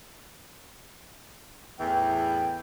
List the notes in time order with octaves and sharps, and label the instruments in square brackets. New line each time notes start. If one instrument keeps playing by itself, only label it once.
[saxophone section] E2 A2 E3 [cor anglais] G5